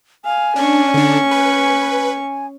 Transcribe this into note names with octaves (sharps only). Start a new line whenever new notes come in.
F5 G#5
C#4 D4 C#6
D3 D4
B4